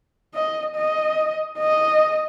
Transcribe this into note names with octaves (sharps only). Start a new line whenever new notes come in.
D#5
D#5
D#5